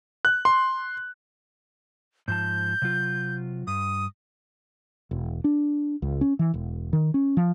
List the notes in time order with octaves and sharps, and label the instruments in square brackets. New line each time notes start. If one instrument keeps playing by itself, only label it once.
[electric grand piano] F#6
C6
[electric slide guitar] G#2 F3 A5 [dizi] G6
[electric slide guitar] C3 F#3 F4
[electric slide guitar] G2 [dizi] D#6
[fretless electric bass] E1
D4
C#2
C#4
E3
E1
D#3
C#4
F3